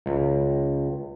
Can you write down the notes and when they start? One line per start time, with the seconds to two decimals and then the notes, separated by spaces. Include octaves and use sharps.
0.06 C#2